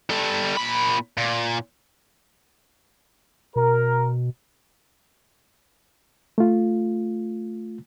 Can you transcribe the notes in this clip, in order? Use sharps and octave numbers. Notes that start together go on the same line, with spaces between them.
G3 A4
A#2 B5
A#2
B2 A#4
A3 F4